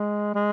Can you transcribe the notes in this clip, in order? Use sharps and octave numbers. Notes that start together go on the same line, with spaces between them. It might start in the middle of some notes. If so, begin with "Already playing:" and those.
Already playing: G#3
G#3